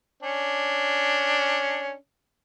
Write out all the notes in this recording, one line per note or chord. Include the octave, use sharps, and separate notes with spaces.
C#4 D4